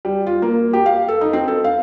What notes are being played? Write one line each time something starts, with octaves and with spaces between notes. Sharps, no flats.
G3
F4
A#3
G4
F5
A4
D#4
C4
A4
F5